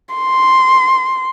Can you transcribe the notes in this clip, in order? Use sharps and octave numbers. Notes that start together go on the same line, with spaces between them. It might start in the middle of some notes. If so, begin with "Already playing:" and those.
C6